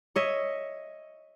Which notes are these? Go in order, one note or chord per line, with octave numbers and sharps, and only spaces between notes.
C#5 D#5 E5